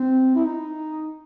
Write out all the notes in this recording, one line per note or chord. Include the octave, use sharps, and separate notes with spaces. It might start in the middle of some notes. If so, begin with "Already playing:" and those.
Already playing: C4
E4
D#4